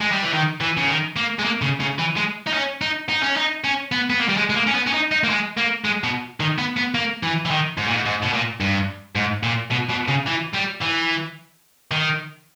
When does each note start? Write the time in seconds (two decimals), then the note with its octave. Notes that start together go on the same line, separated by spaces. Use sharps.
0.01 G#3
0.12 G3
0.23 E3
0.33 D#3
0.61 E3
0.77 C#3
0.89 D#3
1.16 A#3
1.39 G#3
1.44 A#3
1.62 C#3
1.80 C#3
1.99 E3
2.17 G#3
2.47 D#4
2.54 C#4
2.82 D#4
3.09 D#4
3.23 C#4
3.37 D#4
3.64 C#4
3.92 B3
4.10 B3
4.20 A#3
4.29 G3
4.37 G#3
4.50 G#3
4.56 A#3
4.67 C#4
4.75 B3
4.87 C#4
4.94 D#4
5.12 D#4
5.24 A#3
5.30 G#3
5.58 A#3
5.85 G#3
6.04 B2
6.40 D#3
6.58 B3
6.77 B3
6.95 A#3
7.23 E3
7.45 E3
7.51 D#3
7.77 G#2
7.87 A#2
7.95 G#2
8.05 G#2
8.22 B2
8.33 A#2
8.60 G2
9.16 G#2
9.43 A#2
9.71 B2
9.90 B2
10.08 C#3
10.26 E3
10.54 G3
10.81 E3
11.91 D#3